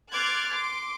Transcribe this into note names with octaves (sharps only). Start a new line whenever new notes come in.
C6 D6 F6 F#6 G#6 A6
C6 D6